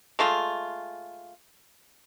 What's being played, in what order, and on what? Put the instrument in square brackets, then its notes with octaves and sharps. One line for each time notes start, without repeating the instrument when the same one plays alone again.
[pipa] G#3 A3 F4